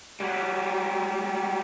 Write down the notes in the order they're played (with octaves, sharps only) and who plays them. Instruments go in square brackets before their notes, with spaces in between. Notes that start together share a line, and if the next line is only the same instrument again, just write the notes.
[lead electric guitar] F#3 G3